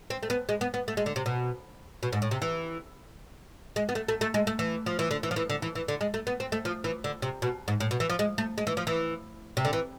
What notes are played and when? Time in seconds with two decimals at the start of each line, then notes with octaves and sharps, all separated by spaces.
0.10 C4
0.23 A3
0.30 B3
0.49 G#3
0.61 B3
0.74 B3
0.88 A3
0.97 G#3
1.06 D3
1.16 C3
1.26 B2
2.03 B2
2.13 G#2
2.22 A2
2.31 C3
2.42 E3
3.76 G#3
3.89 B3
3.95 A3
4.08 A3
4.21 A3
4.34 G#3
4.47 A3
4.59 E3
4.86 F3
4.99 E3
5.11 D3
5.23 E3
5.31 F3
5.36 E3
5.50 D3
5.62 E3
5.75 E3
5.88 D3
6.01 G#3
6.14 A3
6.27 B3
6.40 C4
6.52 A3
6.65 F3
6.84 E3
7.04 D3
7.22 C3
7.42 B2
7.68 G#2
7.80 A2
7.91 B2
8.00 E3
8.10 F3
8.19 G#3
8.38 A3
8.58 G#3
8.67 E3
8.77 F3
8.87 E3
9.57 C3
9.65 D3
9.73 E3